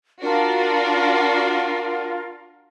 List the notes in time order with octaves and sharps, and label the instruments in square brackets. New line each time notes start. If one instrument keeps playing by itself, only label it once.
[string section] D4 F#4 [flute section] F4 A#4